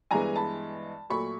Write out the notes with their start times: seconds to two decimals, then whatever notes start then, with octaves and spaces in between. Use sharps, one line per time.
0.11 G2 E3 G#3 B3 G#5 A#5
0.36 A5 B5
1.10 A#2 F#3 A3 B5 C#6